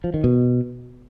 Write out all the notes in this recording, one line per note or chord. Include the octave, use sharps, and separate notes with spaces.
F3
D#3
B2